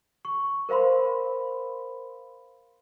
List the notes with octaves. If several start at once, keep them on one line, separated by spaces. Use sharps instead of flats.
C#6
A#4 C5 F5 B5 C6